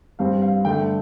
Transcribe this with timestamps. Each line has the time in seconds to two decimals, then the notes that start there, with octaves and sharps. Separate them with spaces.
0.19 G2 G3 C4 F5
0.42 F5
0.65 G2 D3 A3 D4 G5